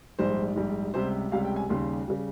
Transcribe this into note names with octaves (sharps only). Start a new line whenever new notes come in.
A#1 G#2 G3 C5
A#1 G#2 G3
C#2 C3 G3 C5
C#2 C3 G3 F5
G5
G#5
D#2 C#3 G3 C6
C#3 G3